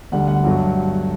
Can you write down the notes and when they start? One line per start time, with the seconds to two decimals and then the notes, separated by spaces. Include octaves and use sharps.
0.12 D2 D3 G3 F#5
0.27 F#5
0.44 G2 F#3 A3